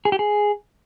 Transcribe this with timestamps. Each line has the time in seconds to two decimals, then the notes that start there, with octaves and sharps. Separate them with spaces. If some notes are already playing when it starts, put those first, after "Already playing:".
0.05 G#4
0.12 G4
0.19 G#4